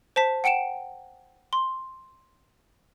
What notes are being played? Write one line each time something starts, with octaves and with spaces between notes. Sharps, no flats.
C5 A5 B6
F#5 G5 C#7 D7 E7
C6